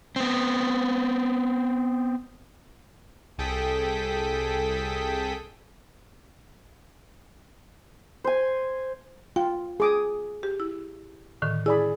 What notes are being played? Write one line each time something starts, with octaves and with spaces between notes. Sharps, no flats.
B3 C4
C2 G#4 A4 G5 D#6 B6
C5 G#5
F4 G5
G#4 D6 D#6
G4
E4
A2 D3 D#3
E4 G#4 D5 B5